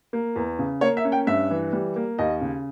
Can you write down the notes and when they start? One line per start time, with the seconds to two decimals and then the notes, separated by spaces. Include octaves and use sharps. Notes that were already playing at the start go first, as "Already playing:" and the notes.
0.13 A#3
0.36 E2
0.59 C#3
0.81 A#3 C#5
0.97 E5
1.05 C#4
1.12 G5
1.27 G2 E5
1.51 E3
1.73 G3
1.96 A#3
2.19 D#2 D#5
2.41 C#3